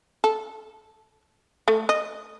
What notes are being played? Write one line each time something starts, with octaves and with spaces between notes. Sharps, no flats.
A4
A3
D#5